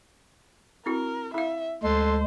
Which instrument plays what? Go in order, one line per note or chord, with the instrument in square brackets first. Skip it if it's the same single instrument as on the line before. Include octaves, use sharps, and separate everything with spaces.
[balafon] C4 E4 F#4 [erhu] A#4
[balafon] E4 F5 [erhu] E5
[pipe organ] D2 G#3 [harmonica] A4 C6 [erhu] C5